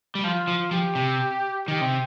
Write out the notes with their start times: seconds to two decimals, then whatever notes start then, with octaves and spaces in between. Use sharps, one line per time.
0.15 G3
0.24 F3 F4
0.47 F3
0.71 F3 G4
0.95 C3
1.67 D#3 G4
1.81 C3